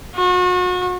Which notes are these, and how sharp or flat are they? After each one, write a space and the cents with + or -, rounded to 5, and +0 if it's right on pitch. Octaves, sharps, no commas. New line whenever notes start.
F#4 -35